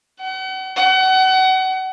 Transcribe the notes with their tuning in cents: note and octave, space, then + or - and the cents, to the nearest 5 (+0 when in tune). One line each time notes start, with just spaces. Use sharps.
F#5 +40
F#5 +30